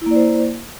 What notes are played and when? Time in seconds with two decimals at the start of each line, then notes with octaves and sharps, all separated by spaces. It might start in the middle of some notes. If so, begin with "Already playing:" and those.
0.02 E4
0.06 A#3
0.11 D5
0.16 C5